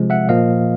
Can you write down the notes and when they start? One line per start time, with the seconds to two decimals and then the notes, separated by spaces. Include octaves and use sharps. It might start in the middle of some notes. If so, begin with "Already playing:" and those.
Already playing: C3 F3 G#3
0.10 E5 F#5
0.29 A#2 F3 A#3 D#5 F5